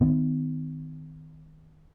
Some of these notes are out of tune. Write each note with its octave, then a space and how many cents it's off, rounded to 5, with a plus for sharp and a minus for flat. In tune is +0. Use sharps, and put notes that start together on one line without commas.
D#3 +5 B3 +45